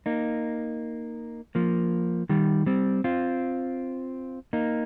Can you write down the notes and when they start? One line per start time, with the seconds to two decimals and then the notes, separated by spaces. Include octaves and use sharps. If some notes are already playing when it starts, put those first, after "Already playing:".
0.06 A#3 D#4
1.55 F3 A#3
2.29 D#3 G3
2.66 G3 C4
3.04 C4 F4
4.53 A#3 D#4